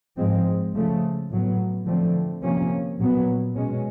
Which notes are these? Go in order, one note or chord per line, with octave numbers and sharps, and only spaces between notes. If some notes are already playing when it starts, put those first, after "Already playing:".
G#2 F3 G#3 C4
C#3 F3 A3
A2 F#3 B3
D3 F3 A3 C4
C3 F3 A#3 C#4
A#2 F#3 B3
B2 G#3 C#4